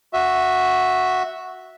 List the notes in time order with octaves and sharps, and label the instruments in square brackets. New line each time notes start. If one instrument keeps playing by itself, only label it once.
[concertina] F#4 E5